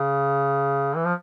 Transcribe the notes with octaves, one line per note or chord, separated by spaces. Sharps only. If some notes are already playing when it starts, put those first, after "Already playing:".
Already playing: C#3
E3
F3